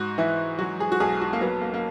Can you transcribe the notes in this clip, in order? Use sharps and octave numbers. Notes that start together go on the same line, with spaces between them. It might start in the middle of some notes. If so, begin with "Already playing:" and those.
Already playing: G#2 F#4
E3 E4
F#3 F#4
G#4
F#4
B1 G#4
F#4
A#3
F#3 B3
A#3
A#3